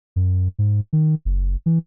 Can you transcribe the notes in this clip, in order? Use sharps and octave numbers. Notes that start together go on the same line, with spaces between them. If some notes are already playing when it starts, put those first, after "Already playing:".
F#2
G#2
D#3
F#1
E3